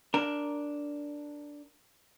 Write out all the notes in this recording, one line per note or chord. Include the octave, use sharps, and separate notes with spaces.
D4 A#4